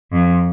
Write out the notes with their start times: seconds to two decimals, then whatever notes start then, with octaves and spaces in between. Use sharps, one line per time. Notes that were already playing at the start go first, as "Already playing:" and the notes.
0.12 F2